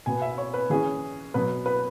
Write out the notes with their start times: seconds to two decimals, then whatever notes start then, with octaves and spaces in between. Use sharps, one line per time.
0.06 B2 B3 G#5
0.22 E5
0.38 C#5
0.54 B4
0.70 E3 C#4 G#4
1.34 B2 F#3 B3 B4
1.66 B4